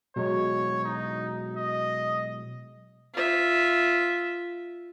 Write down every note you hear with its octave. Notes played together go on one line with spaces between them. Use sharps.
B2 F#3 G#3 C#5
D#4
D#5
F4 E5